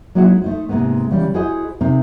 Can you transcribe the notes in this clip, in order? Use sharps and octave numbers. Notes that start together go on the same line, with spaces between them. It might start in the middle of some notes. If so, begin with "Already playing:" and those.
F#3 G#3 A#3 D#4 E4 F#4
A3 D#4 C5
G#2 C3 G#3 A#3 B3
C#3 E3 G3 C#4
E4 F#4 G#4 C5 D#5
C3 C4 D#4 A#4